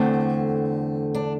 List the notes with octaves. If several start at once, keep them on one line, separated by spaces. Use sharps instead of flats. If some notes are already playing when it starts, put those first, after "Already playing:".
Already playing: E2 D3 A3 C4
D4